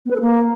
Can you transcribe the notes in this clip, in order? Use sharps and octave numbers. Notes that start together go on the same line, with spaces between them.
B3
B4
A4
A#3